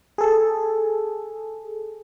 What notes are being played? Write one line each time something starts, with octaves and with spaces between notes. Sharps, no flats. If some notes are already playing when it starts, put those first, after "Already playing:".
G#4 A4